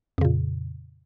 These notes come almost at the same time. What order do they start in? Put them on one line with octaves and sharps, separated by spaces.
F2 C#3 A#2